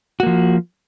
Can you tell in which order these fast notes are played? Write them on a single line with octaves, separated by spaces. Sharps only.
F#4 A#3 F3